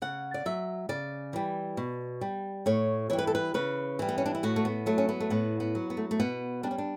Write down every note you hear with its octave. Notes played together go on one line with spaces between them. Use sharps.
C#3 F#5
D5
F#3 E5
C#3 D5
E3 G3
B2
G3
A2 C#5
E3 G3 C#5
B4
A4
B4
C#3 B4
E3 G3
B3
C#4
D4
E4
A2 F#4
A3
B3
F#3 A3
C#4
B3
A3
A2 B3
B3
F#3
B3
A3
A3
B2 B3
G3 D4
C#4
D4